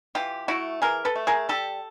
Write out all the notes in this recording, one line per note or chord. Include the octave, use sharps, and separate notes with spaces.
E3 F4 G4
A3 E4 F#4
E3 G#4 A#4
A4 B4
A3
G#4 A#4
G3 G4 A4